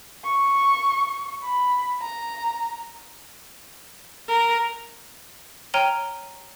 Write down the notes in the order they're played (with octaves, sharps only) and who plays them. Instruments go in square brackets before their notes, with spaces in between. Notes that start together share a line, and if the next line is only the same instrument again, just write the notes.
[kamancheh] C#6
B5
A#5
[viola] A#4
[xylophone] C#5 G5 A#5 F6 D#7 G7